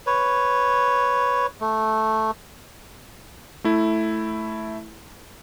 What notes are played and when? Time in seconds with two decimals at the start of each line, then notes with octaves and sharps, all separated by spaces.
0.07 B4 C#5
1.61 A3
3.64 A3 E4